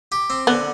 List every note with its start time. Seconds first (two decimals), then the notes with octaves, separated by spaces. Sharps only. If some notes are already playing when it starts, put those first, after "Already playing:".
0.12 G4
0.30 C4
0.47 D3 B3